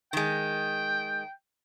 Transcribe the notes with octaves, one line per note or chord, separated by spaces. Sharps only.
D#3 G#3 G5